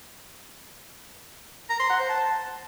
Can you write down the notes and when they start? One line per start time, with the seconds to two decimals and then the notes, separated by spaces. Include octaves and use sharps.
1.70 A#5
1.80 C6
1.89 F#5
1.99 C5
2.09 A5